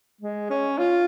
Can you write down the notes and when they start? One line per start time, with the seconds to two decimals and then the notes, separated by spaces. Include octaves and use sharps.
0.21 G#3
0.50 C#4
0.78 F4